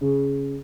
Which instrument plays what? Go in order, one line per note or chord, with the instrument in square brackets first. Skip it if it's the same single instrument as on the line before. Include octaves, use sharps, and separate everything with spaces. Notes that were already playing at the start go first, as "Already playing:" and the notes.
[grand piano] C#3